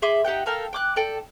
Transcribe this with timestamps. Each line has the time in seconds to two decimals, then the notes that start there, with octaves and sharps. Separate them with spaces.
0.02 G#4 E5 C6 D6
0.25 D#4 G4 F#5 G5
0.46 A4 A#4 F5 G5
0.73 G5 D6 F#6
0.96 A4 D5 G5